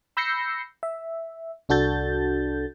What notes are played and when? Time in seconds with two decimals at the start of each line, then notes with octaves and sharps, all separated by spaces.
0.17 B5 E6 G6 A#6 C7 C#7
0.83 E5
1.69 C2 D4 F#4 A4 G6 A6